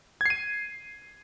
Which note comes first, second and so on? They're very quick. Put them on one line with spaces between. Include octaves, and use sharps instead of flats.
G#6 C7 D#7